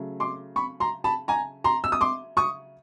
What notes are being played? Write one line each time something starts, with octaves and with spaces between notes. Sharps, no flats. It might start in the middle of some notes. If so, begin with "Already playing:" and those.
Already playing: C#3 F#3 A3
C6 D6
B5 C#6
A#5 C6
A5 B5
G#5 A#5
A#5 C6
E6
D#6
C6 D6
C#6 D#6